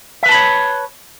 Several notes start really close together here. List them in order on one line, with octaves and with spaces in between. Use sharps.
E5 B4 A5 B5 C#5